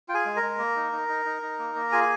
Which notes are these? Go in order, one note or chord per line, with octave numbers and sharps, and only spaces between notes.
F4 G5
G#4 G#5
G#3
A#4 A#5
G#3
A#3
D#4
D#4
D#4
D#4
D#4
A#3
A#3
F4 G#4 G#5